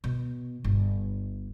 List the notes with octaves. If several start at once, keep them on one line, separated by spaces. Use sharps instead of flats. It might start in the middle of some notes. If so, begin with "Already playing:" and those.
B2
G1